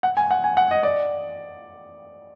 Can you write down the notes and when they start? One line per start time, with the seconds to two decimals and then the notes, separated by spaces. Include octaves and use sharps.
0.03 F#5
0.17 G#5
0.31 F#5
0.44 G#5
0.57 F#5
0.71 D#5
0.83 D5